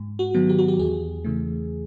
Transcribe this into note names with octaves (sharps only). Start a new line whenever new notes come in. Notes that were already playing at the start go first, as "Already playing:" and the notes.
Already playing: G#2
F#4
D#3 F#3 B3
G4
F#4
G4
E2 G#4
C#3 E3 A3